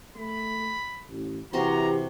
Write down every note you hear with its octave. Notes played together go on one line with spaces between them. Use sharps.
A3 B5
A1
C3 E3 F#4 G4 A#5 C6